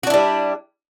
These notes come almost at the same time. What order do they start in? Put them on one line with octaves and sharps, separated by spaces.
F#4 D4 E4 G3